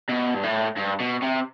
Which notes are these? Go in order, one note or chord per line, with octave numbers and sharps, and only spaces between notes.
B2
G2
A2
G2
B2
C3